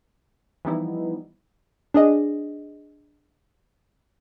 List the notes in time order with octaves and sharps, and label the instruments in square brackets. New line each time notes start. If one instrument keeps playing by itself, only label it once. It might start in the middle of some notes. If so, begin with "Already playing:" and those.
[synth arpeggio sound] E3 F3 G3 B3 D#4 E4
[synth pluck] D4 G#4 D#5